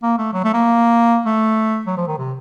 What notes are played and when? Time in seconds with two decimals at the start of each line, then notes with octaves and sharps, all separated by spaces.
0.03 A#3
0.18 A3
0.33 F#3
0.44 A3
0.54 A#3
1.26 A3
1.87 F#3
1.97 F3
2.08 D#3
2.18 C3